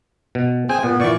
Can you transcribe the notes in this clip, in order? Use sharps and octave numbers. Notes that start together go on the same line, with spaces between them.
B2
C4 G#4 G5 G#5
A#2 B3
A#2 E3 D5 C#6